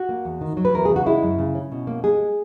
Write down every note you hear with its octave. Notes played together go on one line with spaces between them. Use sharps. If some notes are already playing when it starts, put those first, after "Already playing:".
Already playing: F#4
A#3
E2
D#3
F#3
B4
E2 A#4
C#3 G#4
F#4
G#3 E4
F#2
C#3
C#4
B2
A#3
G#3 G#4